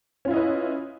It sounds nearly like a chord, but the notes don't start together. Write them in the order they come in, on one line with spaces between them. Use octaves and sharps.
C#4 F4 E4 D#5 B4